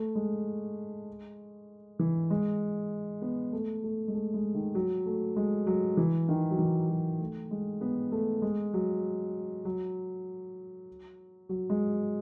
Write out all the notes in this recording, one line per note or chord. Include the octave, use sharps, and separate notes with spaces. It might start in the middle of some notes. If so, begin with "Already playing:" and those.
Already playing: A3
G#3
E3
G#3
B3
A3
A3
G#3
A3
G#3
D#3
F#3
A3
G#3
F#3
E3
D#3
F#3
E3
F#3
A3
G#3
B3
A3
G#3
F#3
F#3
F#3
G#3